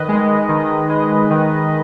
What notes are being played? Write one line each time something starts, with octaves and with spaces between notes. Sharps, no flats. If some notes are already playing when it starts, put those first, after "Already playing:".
Already playing: D#3 B4 D#5
G#3
D#3
G#3
D#3